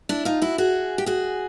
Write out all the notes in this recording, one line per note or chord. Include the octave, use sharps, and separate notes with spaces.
D4 E4
D#4 F4
E4 F#4
F#4 G#4
G4
F#4 G#4